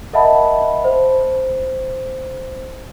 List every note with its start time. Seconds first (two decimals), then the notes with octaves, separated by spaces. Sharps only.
0.13 A#4 D#5 E5 F#5 A5 B5
0.84 C5